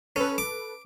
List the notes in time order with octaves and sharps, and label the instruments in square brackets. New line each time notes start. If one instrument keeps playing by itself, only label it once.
[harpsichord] C#4 [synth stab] A4 B4
[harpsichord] D6